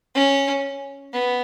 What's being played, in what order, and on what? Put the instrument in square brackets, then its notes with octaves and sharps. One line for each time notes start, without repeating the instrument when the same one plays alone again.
[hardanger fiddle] C#4
B3